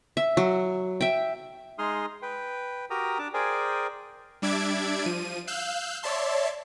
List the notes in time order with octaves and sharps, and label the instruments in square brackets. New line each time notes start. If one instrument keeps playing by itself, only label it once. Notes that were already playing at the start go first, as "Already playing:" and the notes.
[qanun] E5
F#3
E5 G5
[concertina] G#3 D#4 G#4 C6 D#6 F6
B4 G5
F#4 G4 A#4 G5 A#5 D#6
D4 A5 D6
G#4 A#4 C5 D5 G5 G#5
[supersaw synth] G3 D4 D5 E5 G#6 D7
F3 D#7
F5 E6 F#6 G6
C#5 D5 E5 A5 C6